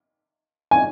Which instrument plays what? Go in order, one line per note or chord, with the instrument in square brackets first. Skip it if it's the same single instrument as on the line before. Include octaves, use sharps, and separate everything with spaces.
[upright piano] G#5